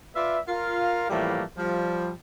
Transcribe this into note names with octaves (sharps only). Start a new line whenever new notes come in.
F4 B4 D5 E5
F4 A#4 F5
A2 E3 F3 G3 A3 A#3
F3 G3